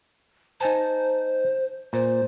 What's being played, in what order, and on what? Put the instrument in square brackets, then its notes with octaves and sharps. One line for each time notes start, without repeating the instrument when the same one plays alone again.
[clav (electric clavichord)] D#4 G#5 A5 [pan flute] C5
[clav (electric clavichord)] A#2 [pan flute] C5